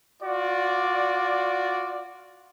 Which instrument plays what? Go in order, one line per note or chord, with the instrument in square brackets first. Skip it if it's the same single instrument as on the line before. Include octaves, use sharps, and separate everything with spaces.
[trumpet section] F4 F#4 D5